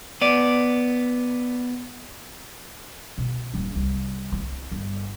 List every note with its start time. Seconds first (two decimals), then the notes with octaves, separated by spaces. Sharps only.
0.21 B3 D5
3.18 B2
3.54 D#1 D4
3.76 C2
4.32 C4 E4
4.72 G1